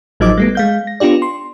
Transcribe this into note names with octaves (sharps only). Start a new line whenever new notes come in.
A1 F3 F#3 D#4 D#5 D6
G3 A3 B3
G#3 F5 G6
A#6
B3 D4 F4 G4 D5
C6